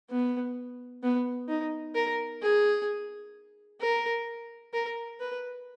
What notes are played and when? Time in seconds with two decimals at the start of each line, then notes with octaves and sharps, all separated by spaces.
0.10 B3
1.03 B3
1.49 D#4
1.95 A#4
2.42 G#4
3.80 A#4
4.73 A#4
5.20 B4